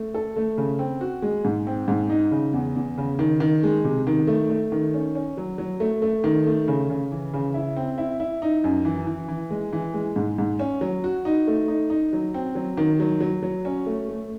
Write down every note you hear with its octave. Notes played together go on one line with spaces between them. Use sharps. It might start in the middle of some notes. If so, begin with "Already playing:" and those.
Already playing: A3
A4
A3
C#3
C4
F#4
G#3
G#2
C4
G#2
D#4
C#3
E2
E2
C#3
D#3
D#3
G#3
C3
D#3
A3
A3
D#3
C#4
C#4
F#3
F#3
A3
A3
D#3
A3
C#3
C#3
E3
C#3
E4
C4
E4
E4
D#4
F#2
E3
E3
E3
G#3
E3
G#3
G#2
G#2
C#4
F#3
F#4
D#4
A3
D#4
D#4
F#3
C4
F#3
D#3
F#3
F#3
F#3
C#4
A3
A3